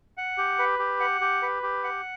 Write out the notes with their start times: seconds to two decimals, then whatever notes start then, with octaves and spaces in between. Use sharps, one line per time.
0.17 F#5
0.38 G4
0.59 B4
0.79 G4
1.00 F#5
1.21 G4
1.42 B4
1.63 G4
1.84 F#5